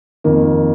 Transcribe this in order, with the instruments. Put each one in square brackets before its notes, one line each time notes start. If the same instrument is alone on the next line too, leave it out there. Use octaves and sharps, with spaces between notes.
[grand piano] F2 D#3 A#3